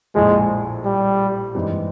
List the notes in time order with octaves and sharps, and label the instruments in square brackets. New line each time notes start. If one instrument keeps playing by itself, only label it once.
[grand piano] A#1 A2 F3 [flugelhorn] G#3
[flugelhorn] G3
[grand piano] G2 E3 G#3 C4 D#4